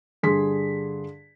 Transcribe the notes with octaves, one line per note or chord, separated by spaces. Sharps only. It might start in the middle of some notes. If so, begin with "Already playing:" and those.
G2 D3 G#4 C6 B6